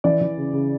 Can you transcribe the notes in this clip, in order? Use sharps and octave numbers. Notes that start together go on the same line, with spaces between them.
E3 D5
E3
C#3
C#3